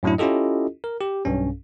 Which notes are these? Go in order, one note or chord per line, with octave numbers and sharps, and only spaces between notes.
F#2 A2 F#3 D4 E4
C#4 E4 F4 G4 A4 D#5
A#4
G4
B1 G2 C#4